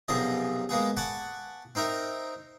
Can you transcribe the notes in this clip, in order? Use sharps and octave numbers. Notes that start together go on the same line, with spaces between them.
B1 F#2 C3 F3 G#4 D#5
G#3 A#3 B3 G#4
F#5 G#5 A5 B5 C#6 D6
C4 D#4 A#4 E5